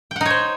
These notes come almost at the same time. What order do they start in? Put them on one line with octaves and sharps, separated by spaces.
G5 F#5 D#4 C#5 C5